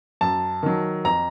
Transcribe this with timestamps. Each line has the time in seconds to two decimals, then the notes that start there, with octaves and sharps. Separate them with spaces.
0.21 F#2 A5
0.63 D#3 F#3
1.05 F2 A#5